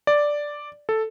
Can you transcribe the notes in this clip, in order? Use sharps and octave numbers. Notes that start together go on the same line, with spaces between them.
D5
A4